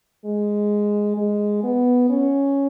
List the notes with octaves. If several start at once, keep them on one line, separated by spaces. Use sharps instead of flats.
G#3
G#3
B3
C#4